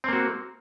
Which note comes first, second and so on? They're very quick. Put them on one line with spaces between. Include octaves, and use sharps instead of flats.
C4 A#3 F#4